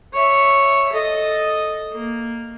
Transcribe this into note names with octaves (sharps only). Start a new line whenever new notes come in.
C#5 E5
A4 D#5
A#3